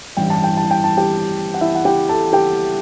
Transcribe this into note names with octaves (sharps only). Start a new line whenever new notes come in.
A1 G2 E3 G5
A5
G5
A5
G5
A5
G4 G5
F#5
E4 E5
F#5
G4 G5
A4 A5
G4 G5